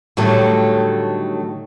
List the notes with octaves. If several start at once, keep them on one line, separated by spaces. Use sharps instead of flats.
A2 D3 D#3 F#3 G3 A3